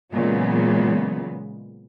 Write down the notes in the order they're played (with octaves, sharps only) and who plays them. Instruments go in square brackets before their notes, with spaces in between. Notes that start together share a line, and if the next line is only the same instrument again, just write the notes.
[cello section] A#2 C#3 E3 F#3 G#3 B3